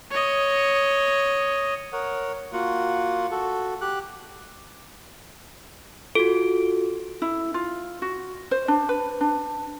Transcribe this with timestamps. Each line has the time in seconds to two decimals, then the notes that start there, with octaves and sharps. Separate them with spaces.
0.11 C#5 D#5
1.93 A#4 C#5 F#5
2.53 A#3 F4 F#4 F#5
3.31 F#4 A4
3.81 G4 F#6
6.15 F4 F#4 A4
7.22 E4
7.54 F4
8.02 F#4
8.51 C5
8.68 D4
8.89 B4
9.21 D4